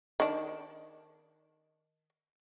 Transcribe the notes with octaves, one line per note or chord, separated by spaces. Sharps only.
D#3 D4